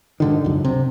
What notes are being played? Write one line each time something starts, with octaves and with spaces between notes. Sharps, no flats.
G#2 D3 D#3
C#2 F#2
C3